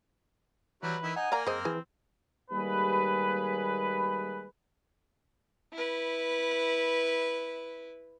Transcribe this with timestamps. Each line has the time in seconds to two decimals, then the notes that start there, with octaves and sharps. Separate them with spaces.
0.83 E3 F#3 G3 E4 B4
1.03 D#3 E4 E5
1.16 D#4 F#5 G#5
1.32 A#3 A#4 D5 F5 A#5
1.47 F#2 C4 G#4 C5 D#5
1.65 E3 E4 G#4 B4
2.51 D#2 G3 G#3 A#3 G#4 B4
5.73 E4 B4